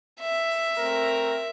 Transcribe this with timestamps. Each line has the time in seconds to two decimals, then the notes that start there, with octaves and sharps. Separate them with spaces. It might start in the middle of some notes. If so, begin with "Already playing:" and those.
0.21 E5
0.77 A3 C4 A#4